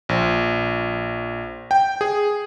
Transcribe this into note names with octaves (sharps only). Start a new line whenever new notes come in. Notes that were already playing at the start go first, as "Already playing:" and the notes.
A#1
G5
G#4